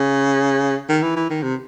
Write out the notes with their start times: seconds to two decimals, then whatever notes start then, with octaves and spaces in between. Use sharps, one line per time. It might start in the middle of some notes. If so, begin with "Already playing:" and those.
Already playing: C#3
0.89 D#3
1.02 E3
1.16 E3
1.30 D#3
1.42 C3